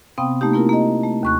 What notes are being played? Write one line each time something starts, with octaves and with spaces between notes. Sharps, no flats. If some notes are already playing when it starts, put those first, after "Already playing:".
C3 B3 C4 F5 G5 D#6
A3 A#3 D#4 G4
A#3 C4 E4 F4 G4 A#4
A#3 G4 D#5
A3
D#2 C#6 F#6